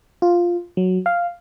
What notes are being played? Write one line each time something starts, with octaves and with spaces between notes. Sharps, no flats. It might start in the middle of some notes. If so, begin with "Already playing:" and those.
F4
F#3
F5